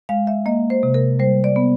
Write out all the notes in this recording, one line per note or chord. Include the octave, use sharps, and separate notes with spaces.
G#3 F5
E5
A#3 D#5
C5
C3
A#4
G3 C5
D5
B3